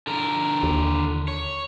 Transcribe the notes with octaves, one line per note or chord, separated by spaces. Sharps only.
D3 A#4
D#2
C#5